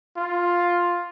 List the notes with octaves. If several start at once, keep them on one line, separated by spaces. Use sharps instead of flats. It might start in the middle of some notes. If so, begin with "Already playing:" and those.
F4